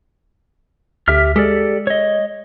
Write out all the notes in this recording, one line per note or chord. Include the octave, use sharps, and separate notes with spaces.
D2 G4 E5 F6
G#3 G4 A4 D5
C#5 D#5